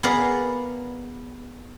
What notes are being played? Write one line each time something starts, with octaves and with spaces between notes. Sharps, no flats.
B3 G#4 A#4 D5 F5